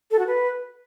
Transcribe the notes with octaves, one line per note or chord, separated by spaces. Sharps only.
A4
F#4
B4